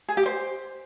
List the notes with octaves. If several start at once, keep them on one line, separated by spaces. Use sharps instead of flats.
G#4
G4
C5